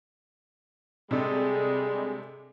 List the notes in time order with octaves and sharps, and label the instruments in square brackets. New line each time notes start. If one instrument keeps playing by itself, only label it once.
[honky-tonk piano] C3 D4 A4 [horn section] G3 G#3